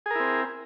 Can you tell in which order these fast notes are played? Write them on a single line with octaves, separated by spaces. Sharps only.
G#4 A#4 E4 C4